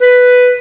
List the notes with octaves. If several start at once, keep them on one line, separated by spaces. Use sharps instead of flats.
B4